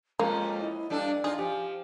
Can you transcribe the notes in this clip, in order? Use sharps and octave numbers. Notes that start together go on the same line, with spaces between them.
F2 G#3 A#3 C#4 F4 A#5
E4 D#5
G2 D4 A4 D5
D4 D#4 F4 G#4
F3 G4 G#5